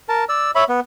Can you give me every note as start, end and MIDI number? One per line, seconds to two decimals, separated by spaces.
0.09 0.24 70
0.09 0.24 81
0.29 0.51 74
0.29 0.51 88
0.55 0.64 73
0.55 0.64 76
0.55 0.64 83
0.69 0.80 59